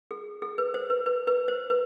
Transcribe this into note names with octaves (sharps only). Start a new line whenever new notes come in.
G#4
G#4
B4
C5
B4
B4
B4
C5
B4